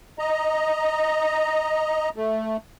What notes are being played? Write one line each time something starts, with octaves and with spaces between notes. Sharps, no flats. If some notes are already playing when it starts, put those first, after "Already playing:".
D#5 A#5
A3